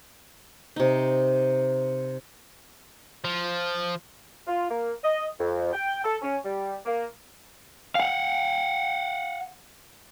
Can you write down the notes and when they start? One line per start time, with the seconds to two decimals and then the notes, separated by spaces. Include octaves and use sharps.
0.76 C3 D#4
3.25 F3
4.47 F4
4.69 A#3
5.03 D#5
5.39 F2
5.73 G5
6.04 A4
6.22 C#4
6.44 G3
6.85 A#3
7.95 F5 F#5